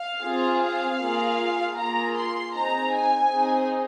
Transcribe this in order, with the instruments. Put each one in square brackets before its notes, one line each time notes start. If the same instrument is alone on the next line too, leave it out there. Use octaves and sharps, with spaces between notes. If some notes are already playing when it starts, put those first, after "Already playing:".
Already playing: [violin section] F5
C4 F4 G#4
F5
A#3 F4 G#4
A#3 F4 G#4 A#5
C6
C4 D#4 G#4 A#5
G#5
C4 D#4 G#4